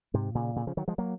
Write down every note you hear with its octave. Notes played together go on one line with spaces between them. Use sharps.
G#2 C3
A#2 C#3
A#2 C#3
C#3 F3
D#3 F#3
F3 G#3
F#3 A#3